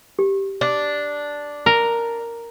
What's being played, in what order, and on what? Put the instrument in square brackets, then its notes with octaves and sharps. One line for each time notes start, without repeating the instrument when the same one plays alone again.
[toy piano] G4
[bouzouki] D4
[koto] A#4